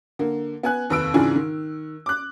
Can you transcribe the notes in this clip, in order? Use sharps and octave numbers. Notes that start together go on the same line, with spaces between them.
D3 A#3
B3 G#5 F#6
F1 D#2 B4 E6 D7
G#2 C#3 E3 D4 F4 G#4
D#3
D6 F#6